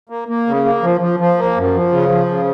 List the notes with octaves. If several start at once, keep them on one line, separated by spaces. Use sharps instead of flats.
A#3
A#3
C#3
A#3
F3
F3
F3
A#3
F#2
F3
C#3
F3
C#3